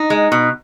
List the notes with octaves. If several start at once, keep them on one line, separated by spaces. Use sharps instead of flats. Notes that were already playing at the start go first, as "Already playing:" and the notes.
Already playing: D#4
G#3
B2